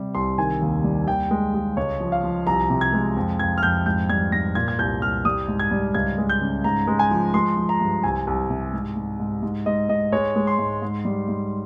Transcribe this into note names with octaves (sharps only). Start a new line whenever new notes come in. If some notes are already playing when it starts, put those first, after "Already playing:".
Already playing: C3 G3
C2 C6
D#3 G#5
D#2
G3
D#2 G5
G#3
G#3
C#2 C#5
F3
F5
F3
C2 A#5
C3
G#6
G#3
F2
F2 G#6
F6
F2 G6
G#2 G6
G3 G#6
G#2 A#6
A#2 G#6
G#6
C2 G6
C2 F6
G3 D#6
G#2
G#6
G3
C#2 G#6
G#3
G6
C#3
G#2 A#5
G#3
G#5
F3
G#3 C6
F3
A#5
G2
C2 G#5
C2
C3
G#2
G#2
G#2
G#2
G#2 D#5
G#2 D#5
G#3 C#5
G#3
C6
G#2
G#2
G3
G#2